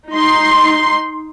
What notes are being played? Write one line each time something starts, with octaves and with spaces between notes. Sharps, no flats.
D#4 C6